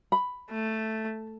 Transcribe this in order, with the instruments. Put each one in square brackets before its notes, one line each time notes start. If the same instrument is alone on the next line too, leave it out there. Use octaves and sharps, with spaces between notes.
[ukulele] B5
[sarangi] A3